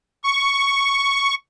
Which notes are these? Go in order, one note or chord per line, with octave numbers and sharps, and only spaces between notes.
C#6